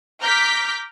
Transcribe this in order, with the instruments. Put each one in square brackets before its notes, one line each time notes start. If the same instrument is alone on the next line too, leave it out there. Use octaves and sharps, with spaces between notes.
[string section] A#5 D6 F6 G6 B6